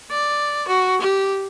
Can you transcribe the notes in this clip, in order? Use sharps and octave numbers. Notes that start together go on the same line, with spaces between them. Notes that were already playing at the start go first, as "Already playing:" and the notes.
D5
F#4
G4